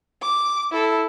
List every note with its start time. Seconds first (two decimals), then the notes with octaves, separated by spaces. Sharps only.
0.22 D6
0.72 E4 A4